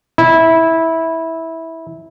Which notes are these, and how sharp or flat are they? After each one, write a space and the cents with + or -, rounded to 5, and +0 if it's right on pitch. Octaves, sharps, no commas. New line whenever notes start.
E4 -15